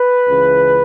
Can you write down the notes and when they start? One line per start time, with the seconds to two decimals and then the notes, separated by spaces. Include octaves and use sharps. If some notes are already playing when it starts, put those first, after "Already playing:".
Already playing: B4
0.27 C#2 C#3 E3